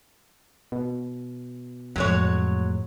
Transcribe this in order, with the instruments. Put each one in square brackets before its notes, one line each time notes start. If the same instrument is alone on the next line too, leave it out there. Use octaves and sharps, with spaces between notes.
[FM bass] B2
[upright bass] F2 A2 [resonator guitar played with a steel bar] F#3 G#3 C#5